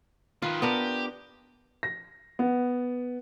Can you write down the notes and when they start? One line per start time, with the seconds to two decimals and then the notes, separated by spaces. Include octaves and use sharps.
0.42 D#3 F4 B4
0.62 B3 D4 G4 A#4
1.83 A#6
2.39 B3